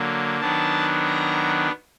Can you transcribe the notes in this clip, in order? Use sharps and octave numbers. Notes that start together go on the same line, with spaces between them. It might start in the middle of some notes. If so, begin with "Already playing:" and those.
Already playing: D3 F#3 A#3
D#3 F#3 B3 D4 A5
A#5